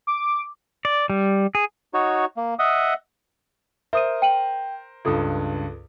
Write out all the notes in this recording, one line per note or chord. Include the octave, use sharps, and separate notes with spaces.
D6
D5
G3
G#4
D#4 F#4 C#5
A#3
D#5 E5 F#5 D#6
A#4 C5 E5 D#6 D#7
G5 D#7 F#7
C#2 G2 F4 A4 D#6